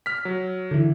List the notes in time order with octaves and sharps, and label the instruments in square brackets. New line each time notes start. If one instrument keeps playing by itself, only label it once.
[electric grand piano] F6 B6
F#3
[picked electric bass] D3 E3